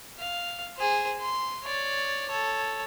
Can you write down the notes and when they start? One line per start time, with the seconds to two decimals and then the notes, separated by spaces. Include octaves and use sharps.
0.19 F5
0.77 G#4 C5
1.21 C6
1.64 C#5 D5
2.29 A4 C#5